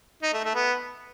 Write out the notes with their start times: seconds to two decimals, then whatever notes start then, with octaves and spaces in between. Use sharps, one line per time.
0.22 D#4
0.33 A3
0.44 A3
0.55 B3